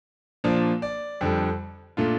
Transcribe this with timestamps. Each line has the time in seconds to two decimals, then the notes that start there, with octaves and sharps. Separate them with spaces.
0.44 A#2 F3 A#3 D4 D5
0.82 D5
1.21 F2 D3 G3
1.97 A#2 A3 D4 F4